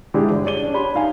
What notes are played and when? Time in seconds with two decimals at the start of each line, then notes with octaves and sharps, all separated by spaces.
0.14 D3 G#3 D4 E4 G4 G#4
0.31 G1
0.44 G#4 C#5 D5 D#7 G7
0.62 C#4 D4
0.74 D4 G4 C#5 B5 C6
0.95 D#4 F5 G#5